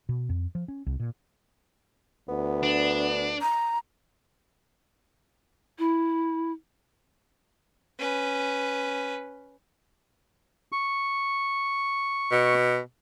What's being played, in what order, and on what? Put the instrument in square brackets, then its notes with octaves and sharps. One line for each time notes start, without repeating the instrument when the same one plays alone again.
[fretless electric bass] B2
F2
F3
C#4
C2
A#2
[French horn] D2 [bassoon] B3
[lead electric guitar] D4
[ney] A#5
[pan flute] E4
[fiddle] C#4 B4
[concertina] C#6
[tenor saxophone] B2